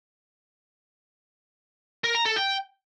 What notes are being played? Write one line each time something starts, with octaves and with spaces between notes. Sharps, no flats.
A#4
A#5
A4
G5